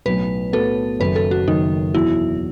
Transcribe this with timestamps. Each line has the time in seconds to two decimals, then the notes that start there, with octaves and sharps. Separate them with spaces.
0.06 B1 A2 F#3 B3 B4
0.53 B1 A2 F#3 B3 A4
1.00 F#1 F#2 D#3 B4
1.16 A4
1.31 F#4
1.47 F#1 F#2 D#3 D#4
1.94 E2 B2 F#3 E4